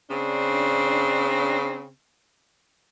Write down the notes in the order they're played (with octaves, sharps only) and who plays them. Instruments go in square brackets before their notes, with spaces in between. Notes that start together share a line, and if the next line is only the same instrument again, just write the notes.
[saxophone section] C#3 C4 D4